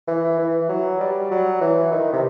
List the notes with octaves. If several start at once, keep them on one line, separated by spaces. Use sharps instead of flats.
E3
E3
F#3
G3
F#3
E3
D#3
C3